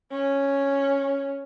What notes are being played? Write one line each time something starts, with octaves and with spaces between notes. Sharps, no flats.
C#4